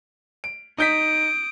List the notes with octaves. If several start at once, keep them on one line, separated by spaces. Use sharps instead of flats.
D7
D#4 D#6 G6 B6 D7